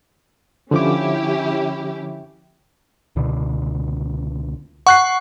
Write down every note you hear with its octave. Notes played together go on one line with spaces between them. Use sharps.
D3 F3 C#4 E4 G4 D6
C#2 B2 D3
F#5 C#6 F#6 C7